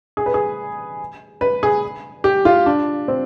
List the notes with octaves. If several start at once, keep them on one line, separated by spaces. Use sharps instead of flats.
G#4
B4
G#4
B4
G#4
G4
F4
D4
C4